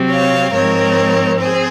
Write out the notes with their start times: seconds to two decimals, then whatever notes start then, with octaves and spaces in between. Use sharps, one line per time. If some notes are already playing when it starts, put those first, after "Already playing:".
Already playing: C3 F#3 C4
0.10 C#5 F5
0.53 G#2 F3 G#3 C4 A#4 C#5
1.39 C4 G#4 C5